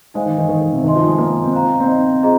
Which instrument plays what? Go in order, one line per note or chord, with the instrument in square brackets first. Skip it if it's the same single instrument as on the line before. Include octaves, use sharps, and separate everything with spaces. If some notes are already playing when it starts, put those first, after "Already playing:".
[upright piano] G#3 [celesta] D#4 C5 F5 G#5
[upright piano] D#3
D#3
D#3
D#3
C3
[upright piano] D#3 [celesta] D#4 C5 D#5 G#5 C6
[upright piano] F3
G#3
A#3
C4
[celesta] C5 F5 A#5
[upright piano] C4
D#4
[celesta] F4 G#4 C5 D#5 A#5